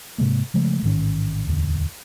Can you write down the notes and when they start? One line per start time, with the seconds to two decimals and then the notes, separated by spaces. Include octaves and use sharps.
0.18 G#2 C3 G#3 A#3
0.54 C#3 F3 G#3 A3
0.82 A1 G#2 D#3 C#4
1.47 D1 E2 D3